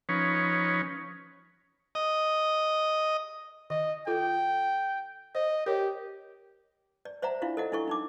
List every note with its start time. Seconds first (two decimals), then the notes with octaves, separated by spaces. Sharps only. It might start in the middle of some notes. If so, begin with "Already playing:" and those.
0.09 F3 C#4 D#4 B4 C#5
1.95 D#5
3.70 D#3 D#5
4.07 F4 A4 G5
5.35 C5 D#5
5.66 G4 A#4 C#5
7.05 D5
7.22 C5 D5 E5 F#5 A#5
7.42 D4 E4 F4 F5
7.57 A4 D#5 F#5
7.72 D4 E4 A4 C#6
7.87 D4 D#4 D6